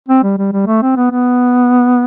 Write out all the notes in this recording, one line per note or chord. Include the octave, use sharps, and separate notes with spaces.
C4
G3
G3
G3
A3
C4
B3
B3